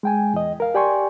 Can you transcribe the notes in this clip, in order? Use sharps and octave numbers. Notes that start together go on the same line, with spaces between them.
G#3 G5 G#5
E2 D#5
A#4 F5
G4 D5 G5 G#5 C6 C#6